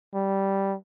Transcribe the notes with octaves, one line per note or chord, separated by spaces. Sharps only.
G3